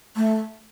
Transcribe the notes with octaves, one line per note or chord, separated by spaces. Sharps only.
A3